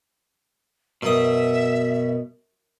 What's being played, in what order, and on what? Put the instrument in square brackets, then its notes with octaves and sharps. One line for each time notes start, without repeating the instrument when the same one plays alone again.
[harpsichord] F#2 D#6 [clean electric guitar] B2 [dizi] E5